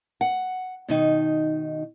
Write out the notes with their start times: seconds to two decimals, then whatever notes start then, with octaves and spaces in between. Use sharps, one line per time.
0.21 F#5
0.88 B2 D#3 D#4